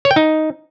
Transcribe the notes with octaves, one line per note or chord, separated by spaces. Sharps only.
C#5
G5
D#4